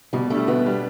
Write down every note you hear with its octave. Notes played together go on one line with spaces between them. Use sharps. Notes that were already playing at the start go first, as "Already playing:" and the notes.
B2 G3
G3 A3 D4
B2 B3
G3 D4